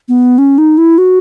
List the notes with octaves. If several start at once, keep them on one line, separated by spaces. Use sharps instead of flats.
B3
C#4
D#4
E4
F#4